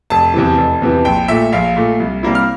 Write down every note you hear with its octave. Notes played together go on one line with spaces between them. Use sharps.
F1 A5
E2 C3 E3
F1
E2 C3 E3
A#1 G5
A#2 A3 E5
A#1 F5
A#2 A3
C2
C3 G3 A#3 E4
F6